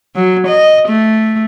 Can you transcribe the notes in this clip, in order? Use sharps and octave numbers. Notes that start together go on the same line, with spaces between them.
F#3
D#5
A3